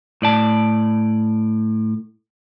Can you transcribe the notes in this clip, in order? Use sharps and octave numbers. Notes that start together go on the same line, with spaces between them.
A2 D5 A5